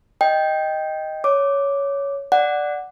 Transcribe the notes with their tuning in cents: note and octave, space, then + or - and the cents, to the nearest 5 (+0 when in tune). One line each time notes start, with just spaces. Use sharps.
D#5 +5 G5 +0
C#5 +10 D6 +0
D5 +0 F#5 +0